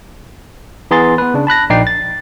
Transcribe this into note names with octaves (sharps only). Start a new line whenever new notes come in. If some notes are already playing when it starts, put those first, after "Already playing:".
E3 B3 G#4 A#5 C6 A6
B3 B4
C#3 D4
A5 B5 F#6 A#6
A#1 D#4 D5 G5 C7
A6